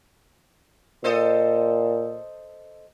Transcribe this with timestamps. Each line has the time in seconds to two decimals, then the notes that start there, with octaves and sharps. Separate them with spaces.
1.04 A#2 A4 C5 D#5